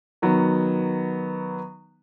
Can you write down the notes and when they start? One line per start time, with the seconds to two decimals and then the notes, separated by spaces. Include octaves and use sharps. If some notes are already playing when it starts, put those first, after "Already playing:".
0.22 D#3 F#3 B3